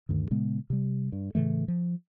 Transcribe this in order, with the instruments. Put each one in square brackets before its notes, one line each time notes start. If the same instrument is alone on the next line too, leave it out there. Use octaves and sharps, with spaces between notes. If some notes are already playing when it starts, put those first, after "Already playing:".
[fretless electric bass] D2 G2 D#3
A#2 C#3 G#3 B3
C3 G3
G2
A2 C#3 E3 A3
F3